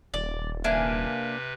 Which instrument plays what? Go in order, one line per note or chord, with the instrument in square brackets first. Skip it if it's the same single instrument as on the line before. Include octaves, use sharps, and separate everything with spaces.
[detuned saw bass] D#1 [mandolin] D5
[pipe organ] C3 B4 [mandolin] A#3 D4 G#5 [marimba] E5